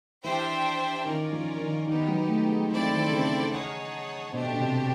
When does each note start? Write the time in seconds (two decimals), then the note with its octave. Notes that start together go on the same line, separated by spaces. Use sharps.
0.23 E3 D4 G4 C5 E5 G5
1.05 D#3 C#4 F4 A#4 D5
1.32 F3
1.60 D#3
1.87 D#3 B3 D#4 G4
2.08 F#3
2.28 A3
2.49 G#3
2.69 E3 C4 E4 A4 D5
2.89 D#3
3.10 C#3
3.50 D#4 G#4 C#5 F#5 A5
4.33 B2 A3 D4 G4 C5
4.53 B2
4.60 C3